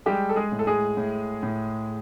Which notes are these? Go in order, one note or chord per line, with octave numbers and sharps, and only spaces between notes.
G3 G#3 G4
A4
G#3 G#4
A2
A4
G#3 G#4
A2
A2